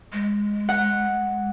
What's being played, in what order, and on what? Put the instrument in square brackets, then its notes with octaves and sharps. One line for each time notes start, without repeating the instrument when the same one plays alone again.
[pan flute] G#3
[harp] F#5